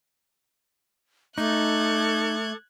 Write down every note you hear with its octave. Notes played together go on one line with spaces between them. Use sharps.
A3 D#4 A4 D6 F#6 G#6